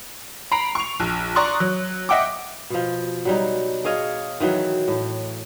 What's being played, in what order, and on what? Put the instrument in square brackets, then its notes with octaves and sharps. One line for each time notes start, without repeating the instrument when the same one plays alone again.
[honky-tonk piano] A#5 B5 C7 D7 F7
C#6 F7
A#1
D5 A#5 C6 C#6 D#6 F#6
F#3
D#5 E5 F#5 G5 D6
[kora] B2 F3
F#3 G3 D#4
G#4 C#5 D#5 F5
D#3 E3 F#3
A2